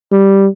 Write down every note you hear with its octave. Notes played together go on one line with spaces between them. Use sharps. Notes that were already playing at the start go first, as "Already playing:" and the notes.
G3